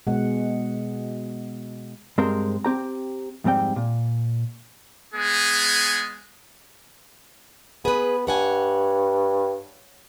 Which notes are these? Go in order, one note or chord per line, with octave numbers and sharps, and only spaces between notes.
B2 G#3 F#4 F#5
G2 G#3 C4 A#4 C5 A#5
C4 G4 A#5
F2 G#2 G3 C4 G5
A#2
G#3 B3 G#4
B3 G#4 B4
G2 C#5 F#5 G#5